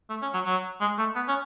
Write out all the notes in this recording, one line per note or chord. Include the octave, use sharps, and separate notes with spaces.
A3
C#4
F#3
F#3
G#3
A3
B3
C#4